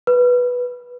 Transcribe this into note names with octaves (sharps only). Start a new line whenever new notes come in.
B4